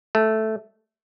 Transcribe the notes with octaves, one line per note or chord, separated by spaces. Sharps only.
A3